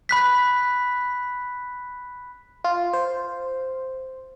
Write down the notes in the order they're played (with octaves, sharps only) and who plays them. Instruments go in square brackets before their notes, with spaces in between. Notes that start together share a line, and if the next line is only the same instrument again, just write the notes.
[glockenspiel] B5 F#6 B6
[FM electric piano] F4
C5